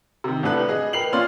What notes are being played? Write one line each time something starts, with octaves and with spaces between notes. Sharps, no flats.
C3 D#3
C2 A2 D4 A4 B4 F#6
G#4 D#5
A#4 B4 G5 C7 F7 F#7
A#2 C#4 F4 D5 C6 F6